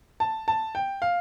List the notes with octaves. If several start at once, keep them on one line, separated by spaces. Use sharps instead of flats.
A5
A5
G5
F5